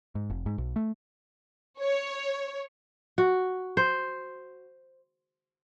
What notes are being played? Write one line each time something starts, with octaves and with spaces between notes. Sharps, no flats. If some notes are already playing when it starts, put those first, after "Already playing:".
G#2
F1
G#2
B1
A3
C#5
F#4
C5